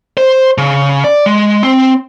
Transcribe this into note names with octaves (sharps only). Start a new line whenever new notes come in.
C5
C#3
D5
G#3
C4